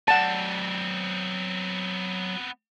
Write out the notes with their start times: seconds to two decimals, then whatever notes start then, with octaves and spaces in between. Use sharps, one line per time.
0.08 F#3 B3 C4 D5 F#5 A5